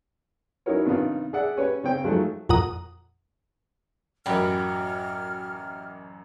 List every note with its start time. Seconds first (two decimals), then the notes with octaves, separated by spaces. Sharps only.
0.66 C#4 D#4 E4 F#4 A#4 C#5
0.85 G2 C3 D#3 B3 D#4 F4
1.33 G#4 D5 E5 F#5
1.57 C#4 G4 B4 C#5
1.83 C#3 C4 C#4 G5
2.04 F3 F#3 G#3 A3 D#4
2.49 F2 A#2 F#5 A#5 D#6
4.26 A1 F#2 F#3 G4 A#4 F#5 B5 F6